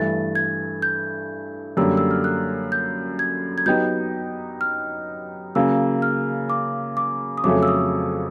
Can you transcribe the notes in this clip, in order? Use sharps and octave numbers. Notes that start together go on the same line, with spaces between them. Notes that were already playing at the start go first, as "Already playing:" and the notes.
Already playing: G2 E3 A3 A6
G#6
G6
F#2 D3 G3 A#3 E6
E6
F6
F#6
G6
G#6
G#6
F#3 B3 D#4 G4 G6
F6
C#3 F#3 A#3 E6
F6
D6
D6
D#6
F2 C#3 F#3 A3 C#4 D6
E6
D#6